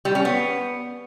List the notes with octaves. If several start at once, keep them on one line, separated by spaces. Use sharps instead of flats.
G3
C#4
B3